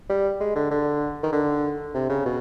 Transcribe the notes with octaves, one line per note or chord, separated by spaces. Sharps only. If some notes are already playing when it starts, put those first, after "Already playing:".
G3
G#3
D3
D3
D#3
D3
C3
C#3
B2